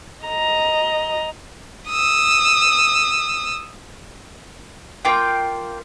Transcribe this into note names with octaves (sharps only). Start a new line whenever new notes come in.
D#5 A#5
D#6 E6
A#3 F4 G5